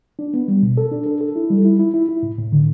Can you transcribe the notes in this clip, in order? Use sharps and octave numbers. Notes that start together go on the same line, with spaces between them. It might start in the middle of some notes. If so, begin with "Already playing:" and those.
D4
B3
G3
B2
A4
D4
A4
A4
E4
G3
E4
E4
E4
E4
A2
A2
D3